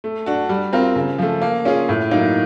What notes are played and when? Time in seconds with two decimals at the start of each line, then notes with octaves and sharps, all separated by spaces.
0.04 A3
0.26 D4 F#4
0.49 G3
0.73 C4 F4 A#4
0.96 C#3
1.18 F3 A3
1.42 A#3
1.65 C#4 F4 G#4
1.89 A2
2.11 F#3 A#3 D#4